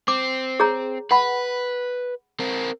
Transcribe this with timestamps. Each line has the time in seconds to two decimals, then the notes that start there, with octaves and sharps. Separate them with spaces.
0.08 C4 D6
0.60 G#4 C#5 A#5
1.11 B4 F#5 B5
2.40 C4 A#4